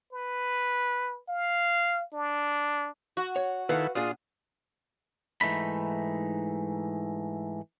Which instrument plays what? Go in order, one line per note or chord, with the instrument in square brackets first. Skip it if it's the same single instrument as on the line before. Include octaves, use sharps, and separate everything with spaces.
[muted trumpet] B4
F5
D4
[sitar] F#4
[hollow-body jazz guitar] C#5
[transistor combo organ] D#3 E4 A4 [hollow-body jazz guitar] B4 F5 F#5
[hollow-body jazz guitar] A#2 D4 G#4 [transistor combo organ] F4 D#6
[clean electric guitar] G#2 E3 A3 D#4 B5